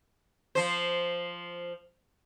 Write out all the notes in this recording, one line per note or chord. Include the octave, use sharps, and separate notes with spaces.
F3 C5